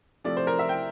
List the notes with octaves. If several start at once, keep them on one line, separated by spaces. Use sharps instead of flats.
C3 F3 A3 D5
C5
A#4
E5
G5